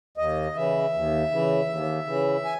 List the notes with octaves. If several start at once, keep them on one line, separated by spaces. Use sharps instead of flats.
D#2 D#5
C#3 E3 E5
D#2
C#3 E3
D#2
C#3 E3
G#5